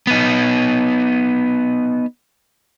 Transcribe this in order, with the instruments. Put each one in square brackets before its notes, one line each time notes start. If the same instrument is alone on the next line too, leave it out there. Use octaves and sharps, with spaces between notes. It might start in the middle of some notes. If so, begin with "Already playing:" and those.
[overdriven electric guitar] B3 D#4